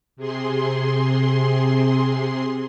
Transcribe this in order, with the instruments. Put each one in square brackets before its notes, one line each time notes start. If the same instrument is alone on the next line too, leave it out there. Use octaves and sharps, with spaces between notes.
[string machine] C3 G#4 C6